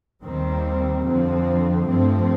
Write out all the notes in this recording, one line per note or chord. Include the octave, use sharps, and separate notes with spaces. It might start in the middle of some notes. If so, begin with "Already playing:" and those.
D#2 D#3 G3 C4
F2 D3 F3 C4
G2 F3 A3 C4